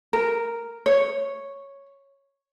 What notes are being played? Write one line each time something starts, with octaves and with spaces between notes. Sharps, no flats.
A#4
C#5